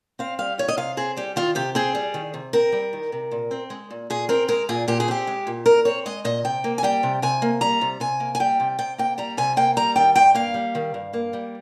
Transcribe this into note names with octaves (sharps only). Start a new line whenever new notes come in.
C4 F5
G3 F5
D#3 C#5
D#5
C3 F5
C4 G#4
G3 G4
D#3 F4
C3 G4
C4 G#4
G3
D#3
C3
C4 A#4
G3
D#3
C3
A#2
C4
G#3
A#2
A#2 G#4
C4 A#4
G#3 A#4
A#2 G#4
A#2 G4
G#4
C4 G4
G#3
A#2
A#2 A#4
C4 C#5
G#3 D#5
A#2 D#5
C3 G5
A#3
G#5
G3 G5
C3
C3 G#5
A#3
G3 A#5
C3
C3 G#5
A#3
G#5
G3 G5
C3
C3 G5
A#3 G5
G3 A#5
C3 G#5
A#3 G5
G3 A#5
D#3 G5
G2 G5
A#3 F5
G3
D#3
G2
A#3
G3